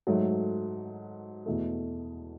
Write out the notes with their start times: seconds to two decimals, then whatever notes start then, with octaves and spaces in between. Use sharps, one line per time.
0.07 G#2 F#3 A3
1.46 E2 B2 A3